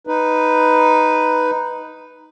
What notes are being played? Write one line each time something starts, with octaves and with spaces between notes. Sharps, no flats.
D#4 B4